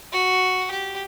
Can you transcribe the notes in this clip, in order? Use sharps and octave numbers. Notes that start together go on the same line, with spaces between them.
F#4
G4